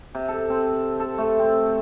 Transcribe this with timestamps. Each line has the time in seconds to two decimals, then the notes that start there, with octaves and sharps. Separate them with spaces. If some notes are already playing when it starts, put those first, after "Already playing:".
0.15 C3
0.28 A4
0.50 C4
1.00 A4
1.18 A3
1.39 C4